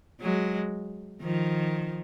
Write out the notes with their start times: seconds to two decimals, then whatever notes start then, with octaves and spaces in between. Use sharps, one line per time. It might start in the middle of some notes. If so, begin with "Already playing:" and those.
0.21 F#3 G#3
1.22 D#3 F3